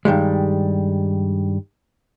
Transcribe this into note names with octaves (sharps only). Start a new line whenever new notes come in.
G2 D#3 G3 G#3